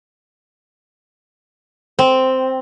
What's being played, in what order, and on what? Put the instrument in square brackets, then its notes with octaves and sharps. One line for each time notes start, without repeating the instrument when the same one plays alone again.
[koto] C4